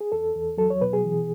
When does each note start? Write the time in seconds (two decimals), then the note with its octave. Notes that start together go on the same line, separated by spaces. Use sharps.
0.01 G#4
0.12 E2 A4
0.35 E2
0.58 F#3 A4
0.70 C#5
0.81 B2 B4
0.93 G#4
1.04 E3